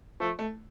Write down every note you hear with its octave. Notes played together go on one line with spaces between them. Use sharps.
F3 A3
A3